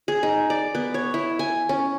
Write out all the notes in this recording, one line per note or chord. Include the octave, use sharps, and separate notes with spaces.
G#4
D#4
D5
B3
C#5
E4
G#5
C#4